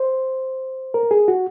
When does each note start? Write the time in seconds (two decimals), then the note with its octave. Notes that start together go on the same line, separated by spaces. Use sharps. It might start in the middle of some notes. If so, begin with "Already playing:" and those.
Already playing: C5
0.94 A#4
1.11 G#4
1.28 F#4